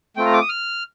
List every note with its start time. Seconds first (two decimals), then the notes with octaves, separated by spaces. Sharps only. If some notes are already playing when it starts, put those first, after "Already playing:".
0.17 A3 C4 F4 G5
0.25 A#5
0.33 D6
0.41 D#6
0.49 F6